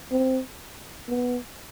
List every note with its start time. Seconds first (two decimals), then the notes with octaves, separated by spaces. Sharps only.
0.11 C4
1.08 B3